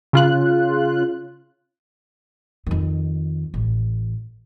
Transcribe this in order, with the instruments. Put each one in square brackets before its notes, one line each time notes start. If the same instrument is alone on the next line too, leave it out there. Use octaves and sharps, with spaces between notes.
[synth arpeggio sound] C#3 F4 F#6
[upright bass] F2 D#3
A1